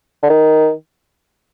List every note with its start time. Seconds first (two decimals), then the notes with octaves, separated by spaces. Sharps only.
0.23 D3
0.30 D#3